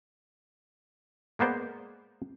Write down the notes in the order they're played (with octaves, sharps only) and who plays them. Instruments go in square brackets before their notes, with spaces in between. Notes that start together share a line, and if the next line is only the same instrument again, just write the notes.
[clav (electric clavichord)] G#3 A#3 B3 C5 D5